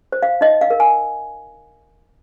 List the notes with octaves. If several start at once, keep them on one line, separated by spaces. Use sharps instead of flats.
C5
F5
D#4 D#5
F5
A#4
G#5